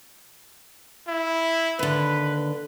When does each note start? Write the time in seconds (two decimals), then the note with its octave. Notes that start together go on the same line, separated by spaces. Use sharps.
1.08 E4
1.79 D#2 D3 B4